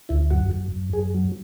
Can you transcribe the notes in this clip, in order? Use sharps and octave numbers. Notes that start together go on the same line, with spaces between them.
D2 E4
F#2 F#4
F#2
F#2
F#2 G#4
F#3